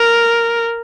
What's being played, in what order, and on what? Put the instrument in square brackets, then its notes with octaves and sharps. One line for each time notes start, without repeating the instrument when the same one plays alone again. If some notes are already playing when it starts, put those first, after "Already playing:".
Already playing: [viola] A#4